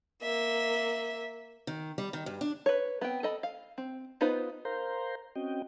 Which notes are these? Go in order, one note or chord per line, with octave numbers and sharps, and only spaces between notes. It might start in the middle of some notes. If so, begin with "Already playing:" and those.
A#3 E5
D#3
G3
D#3
G2
D4
B4 C#5
B3 C4 G5
A4 D#5 B5
F5
C4
B3 D#4 F4 B4 C5
A#4 C5 F5 A#5 C6 G6
C4 C#4 F#4 D#5 G5